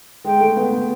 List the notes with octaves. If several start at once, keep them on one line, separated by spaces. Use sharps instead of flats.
G#3 G5
A3
B3
B3